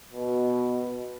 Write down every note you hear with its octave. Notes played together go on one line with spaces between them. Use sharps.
B2